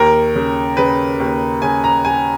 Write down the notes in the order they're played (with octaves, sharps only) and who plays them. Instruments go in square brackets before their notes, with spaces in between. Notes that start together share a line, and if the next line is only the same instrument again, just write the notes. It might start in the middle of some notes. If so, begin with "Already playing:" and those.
Already playing: [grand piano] D#2 A#4
C#3
C#3 B4
D#2
C#3 G#5
A#5
C#3 G#5